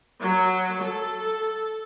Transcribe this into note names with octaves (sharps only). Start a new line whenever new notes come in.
F#3
A4